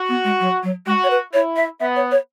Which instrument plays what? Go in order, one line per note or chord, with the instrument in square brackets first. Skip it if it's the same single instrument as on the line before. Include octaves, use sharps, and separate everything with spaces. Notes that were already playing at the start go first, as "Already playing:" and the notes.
Already playing: [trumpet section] F#4
[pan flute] B3
G#3
F#3
F#3
[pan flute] G#3 [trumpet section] F#4
[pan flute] C#5
B4
[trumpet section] E4 [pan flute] C#5
[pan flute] E5
[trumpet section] B3 [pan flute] E5
[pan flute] C#5
C#5